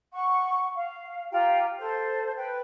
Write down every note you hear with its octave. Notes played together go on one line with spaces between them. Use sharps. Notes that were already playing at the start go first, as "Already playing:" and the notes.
F#5 C#6
F5
F4 G4 G5 A#5
A4 C5
B4 G5